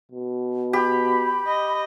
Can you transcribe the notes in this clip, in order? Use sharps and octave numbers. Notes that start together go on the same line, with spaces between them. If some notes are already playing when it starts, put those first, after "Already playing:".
B2
G4 B5
D#5